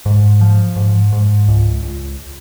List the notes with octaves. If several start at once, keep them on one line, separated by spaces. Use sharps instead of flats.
G#2
F3
G#2
G#2
C#2
C#2